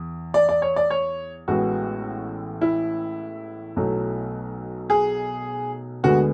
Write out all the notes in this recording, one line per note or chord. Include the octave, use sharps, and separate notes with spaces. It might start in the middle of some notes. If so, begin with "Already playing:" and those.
Already playing: E2
D5
D5
C#5
D5
C#5
A1 A2 G#3 B3 F#4
E4
B1 B2 F#3 A3
G#4
D2 D3 G#3 B3 F#4